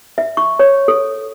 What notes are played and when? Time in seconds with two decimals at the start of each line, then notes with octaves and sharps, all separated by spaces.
0.18 E5
0.37 C#6
0.59 C#5
0.88 A4